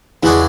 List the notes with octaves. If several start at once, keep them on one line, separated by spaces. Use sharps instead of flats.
E2 C#3 G#3 D4 E4 F#4